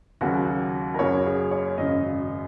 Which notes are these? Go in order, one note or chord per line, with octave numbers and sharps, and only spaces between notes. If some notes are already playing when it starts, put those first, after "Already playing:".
D#2 C#3 F#3 A#3 F#4
A#4
F#2 C#3 F#3 A#3 C#5
G#4
C#5
G#1 F#2 C#3 D#5